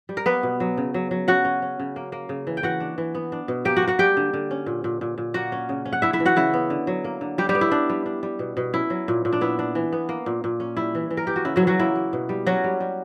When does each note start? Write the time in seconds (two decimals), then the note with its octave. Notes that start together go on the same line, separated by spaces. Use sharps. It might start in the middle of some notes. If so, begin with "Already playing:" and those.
0.09 G3
0.17 A#4
0.26 A#3 B3 B4
0.43 B2
0.60 F#3
0.77 C#3
0.94 F#3
1.11 F#3
1.28 C#3 F#4 F#5
1.45 C#4
1.62 C#4
1.80 C#3
1.96 A#3
2.12 A#3
2.29 C#3
2.47 E3
2.57 G5
2.63 E3 F#4 F#5
2.80 D4
2.98 E3
3.15 B3
3.32 D4
3.48 B2
3.65 A#3 G4 G5
3.76 F#4 F#5
3.82 A#3
3.88 F#4 F#5
3.99 G3 G4 G5
4.17 D3
4.34 D3
4.51 C#4
4.66 A#2
4.84 A#2
5.01 A#2
5.18 A#2
5.34 A#3 F#4 F#5
5.52 C#4
5.69 C#3
5.85 C#4
5.93 F#5
6.02 D4 E4 E5
6.13 E4 E5
6.20 E3
6.25 F#4 F#5
6.36 C#3 E4 E5
6.54 B3
6.70 D3
6.87 F#3
7.04 A#3
7.21 D3
7.38 G3 D4 G4
7.49 G3 G4
7.55 B3
7.61 E4
7.72 G3 D4
7.90 G3
8.06 D4
8.23 G3
8.39 B2
8.57 B2
8.73 C#4 E4
8.90 F#3
9.08 A#2
9.25 A#2
9.33 D4
9.41 B3 E4
9.59 D4
9.75 E3
9.93 B3
10.09 A#3
10.26 A#2
10.44 A#2
10.60 C#4
10.77 G3 E4
10.95 E3
11.11 E3
11.17 A#4
11.27 E3 G4
11.36 F#4
11.45 C#3 E4
11.56 F#3 F#4
11.62 E3
11.67 F#3 F#4
11.79 A#3 E4
11.96 A#3
12.13 B2
12.29 G3
12.47 F#3 C#4 F#4
12.64 G3
12.80 G3